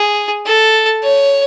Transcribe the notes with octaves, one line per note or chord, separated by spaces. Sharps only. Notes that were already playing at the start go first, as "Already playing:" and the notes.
Already playing: G#4
A4
C#5